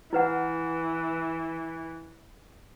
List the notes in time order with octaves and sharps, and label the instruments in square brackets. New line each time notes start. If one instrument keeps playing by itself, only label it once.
[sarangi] E3 [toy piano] E4 B4 F#5